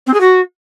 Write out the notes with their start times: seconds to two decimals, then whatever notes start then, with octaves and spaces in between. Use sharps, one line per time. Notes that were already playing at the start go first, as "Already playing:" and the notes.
0.07 C4
0.14 G#4
0.21 F#4